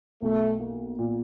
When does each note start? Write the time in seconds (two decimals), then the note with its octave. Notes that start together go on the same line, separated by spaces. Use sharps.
0.22 B1 A3
0.60 A#3
0.99 A#2